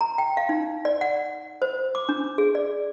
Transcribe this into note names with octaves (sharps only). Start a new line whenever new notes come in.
A#5
G5
F5
D#4
D5
F#5
C5
D6
D4
G#4
D5